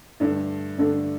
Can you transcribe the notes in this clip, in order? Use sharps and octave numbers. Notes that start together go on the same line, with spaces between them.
G2 D3 A3
G2 D3 A3